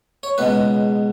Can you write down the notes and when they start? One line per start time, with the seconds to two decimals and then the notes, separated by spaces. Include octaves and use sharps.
0.23 C#5
0.38 C#2 B2 G#3 B4